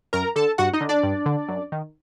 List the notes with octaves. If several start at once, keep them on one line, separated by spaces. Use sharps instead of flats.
F#2 A#4 A#5
D3 A4 A5
G2 F#4 F#5
D#4 D#5
D3
D4 D5
G2
D3
F#2
D#3